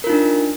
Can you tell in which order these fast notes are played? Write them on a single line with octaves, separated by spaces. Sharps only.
A#4 F4 D#4 D4